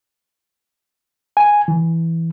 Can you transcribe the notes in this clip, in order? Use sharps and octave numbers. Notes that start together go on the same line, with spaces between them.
G#5
E3